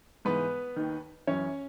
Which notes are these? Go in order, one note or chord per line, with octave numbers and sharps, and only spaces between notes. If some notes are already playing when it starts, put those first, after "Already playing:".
G#2 E3 B3 B4
D#2 D#3
F#2 E3 C#4 C#5